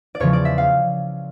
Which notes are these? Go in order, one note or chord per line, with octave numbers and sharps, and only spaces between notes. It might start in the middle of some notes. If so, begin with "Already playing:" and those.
D5
E2 C#3 F3 C#5
D5
E5
F5